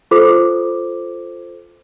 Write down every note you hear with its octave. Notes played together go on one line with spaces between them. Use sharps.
F4 A4 C5 D6